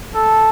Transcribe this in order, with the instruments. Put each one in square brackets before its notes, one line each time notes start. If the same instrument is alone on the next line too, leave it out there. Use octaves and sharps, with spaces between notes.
[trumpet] A4